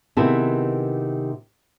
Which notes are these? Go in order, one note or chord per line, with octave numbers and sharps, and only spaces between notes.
C3 D#3 B3 E4 G#4